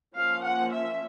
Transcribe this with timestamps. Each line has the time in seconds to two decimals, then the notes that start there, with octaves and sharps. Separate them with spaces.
0.16 F3 A#3 C#4 F5
0.44 F#5
0.72 E5